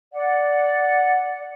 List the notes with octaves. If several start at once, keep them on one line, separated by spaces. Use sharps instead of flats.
D5 F#5